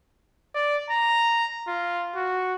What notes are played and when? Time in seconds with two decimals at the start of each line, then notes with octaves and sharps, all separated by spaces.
0.55 D5
0.90 A#5
1.68 F4
2.16 F#4